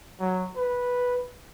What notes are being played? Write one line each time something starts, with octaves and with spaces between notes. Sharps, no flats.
F#3
B4